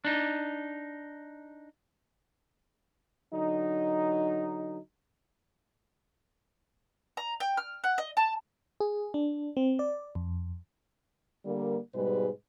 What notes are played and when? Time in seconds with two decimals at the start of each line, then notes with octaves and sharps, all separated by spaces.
0.05 D4 D#4
3.33 D3 F#3 D#4
7.17 A#5
7.40 G5
7.57 F6
7.84 F#5
7.98 D#5
8.17 A5
8.80 G#4
9.14 D4
9.57 C4
9.79 D5
10.15 F2
11.46 D3 G3 A#3
11.95 G#2 B2 G3 G#3 B4